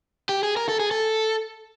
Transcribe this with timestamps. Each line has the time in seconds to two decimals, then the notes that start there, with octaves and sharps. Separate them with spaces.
0.29 G4
0.43 G#4
0.57 A#4
0.68 A4
0.80 G#4
0.91 A4